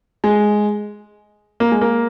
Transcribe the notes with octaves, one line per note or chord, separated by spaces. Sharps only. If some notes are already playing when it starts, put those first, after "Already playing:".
G#3
A#3
G#3
A#3